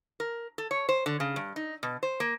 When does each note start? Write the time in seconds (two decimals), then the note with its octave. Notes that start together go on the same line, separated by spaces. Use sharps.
0.20 A#4
0.58 A4
0.71 C#5
0.89 C5
1.06 D3
1.20 C#3
1.36 G2
1.56 D#4
1.83 B2
2.03 C5
2.20 A#3